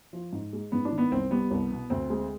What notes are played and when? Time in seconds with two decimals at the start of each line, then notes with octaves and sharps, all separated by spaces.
0.13 F3
0.33 G#2
0.53 G#3
0.72 G#2 B3
0.85 D4
0.92 D#3
0.98 B3
1.12 C2 C4
1.31 G3 B3
1.51 C2
1.71 B2
1.90 D2 C4
2.10 G#3